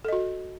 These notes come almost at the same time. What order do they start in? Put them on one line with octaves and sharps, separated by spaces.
A4 D#5 F#4